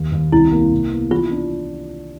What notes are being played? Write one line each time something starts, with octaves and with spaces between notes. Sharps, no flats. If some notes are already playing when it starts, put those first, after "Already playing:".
Already playing: D#2
D#2
C2 E4
A#3
C3
B3
E3 F4
D4